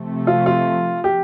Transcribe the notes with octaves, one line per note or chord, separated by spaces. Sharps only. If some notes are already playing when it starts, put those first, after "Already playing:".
Already playing: C3 F3 A3
F4
F4
G4